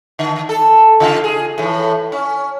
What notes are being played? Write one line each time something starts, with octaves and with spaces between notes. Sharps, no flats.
D3
A4
C#3 F4
G#4
A2 E3
C#4